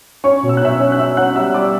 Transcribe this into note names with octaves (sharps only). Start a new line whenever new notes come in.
C#4 C#5 C#6
B2
E6
F#6
C#4 E5 E6
C#4
F#6
C#4 E5 E6
C#4 F#5 F#6
G3 E5 E6
G3 D5 D6